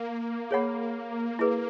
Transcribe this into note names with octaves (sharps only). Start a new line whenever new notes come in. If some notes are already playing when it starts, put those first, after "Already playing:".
Already playing: A#3
G#4 C#5 F#5 B5
E4 G#4 B4